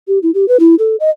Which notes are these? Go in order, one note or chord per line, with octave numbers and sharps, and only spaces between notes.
G4
E4
G4
B4
E4
A4
D#5